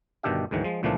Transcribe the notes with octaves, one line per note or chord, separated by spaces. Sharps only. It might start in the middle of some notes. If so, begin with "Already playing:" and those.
G1 B2 D#3 D4 G4 E5
D2 G#2 D#3 E3 F#3
F3 G#3
C#2 A#2 E3 F3 A3 D4